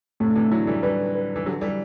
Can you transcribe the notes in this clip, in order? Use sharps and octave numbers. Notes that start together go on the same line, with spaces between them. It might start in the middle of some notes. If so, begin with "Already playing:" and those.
A2 C3 A3
D3
C3 E3
D3 F#3 E4
E3 G3
E3 G3 B4
B4
E3
D3 F#3 G4
E3 G3